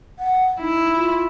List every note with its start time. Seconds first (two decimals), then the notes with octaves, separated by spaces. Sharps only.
0.19 F#5
0.60 D#4 E4
0.94 F4